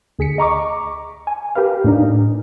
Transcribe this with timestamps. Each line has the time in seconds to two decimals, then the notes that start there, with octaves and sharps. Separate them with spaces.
0.19 D2 G#4 B6 C#7
0.38 D#5 A#5 C#6 D6
1.27 G#5
1.55 G4 A#4 B4 F5
1.84 A2 D4 D#4